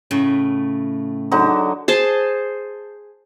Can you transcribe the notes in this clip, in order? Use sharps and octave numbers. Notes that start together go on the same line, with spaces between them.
A2 C#3 A3
D3 F#3 D#4
G#4 C5 A5